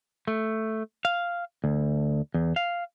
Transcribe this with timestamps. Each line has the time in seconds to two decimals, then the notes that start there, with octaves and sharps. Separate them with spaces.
0.27 A3
1.05 F5
1.64 D2
2.34 E2
2.56 F5